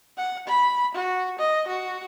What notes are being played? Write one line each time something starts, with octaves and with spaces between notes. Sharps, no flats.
F#5
B5
F#4
D#5
F#4